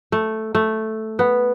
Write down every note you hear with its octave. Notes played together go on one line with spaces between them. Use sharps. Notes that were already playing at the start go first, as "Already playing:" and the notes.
A3
A3
B3